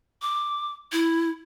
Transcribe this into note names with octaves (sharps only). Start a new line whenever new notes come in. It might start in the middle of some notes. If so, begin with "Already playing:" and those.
D6
E4